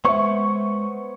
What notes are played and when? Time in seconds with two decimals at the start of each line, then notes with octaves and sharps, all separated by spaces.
0.05 G#3 B3 C5 C#5 E5 C#6